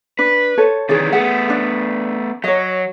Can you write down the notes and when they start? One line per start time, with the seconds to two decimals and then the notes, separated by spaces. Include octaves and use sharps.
0.19 D4 B4
0.58 A4 C5 C#5
0.89 C3 D#3 E3 G#4 C#5 D5
1.13 A3 B3 G#4 F#5
1.50 D4 D5
2.44 F#3 C#5 D#5